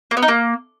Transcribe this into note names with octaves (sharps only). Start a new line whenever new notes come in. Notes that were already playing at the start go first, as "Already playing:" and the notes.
A#3
B3
D#4
A#3